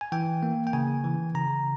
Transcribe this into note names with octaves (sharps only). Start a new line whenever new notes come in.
G#5
E3 G5
A#3
G5
C#3 G#5
E3
C#3 A#5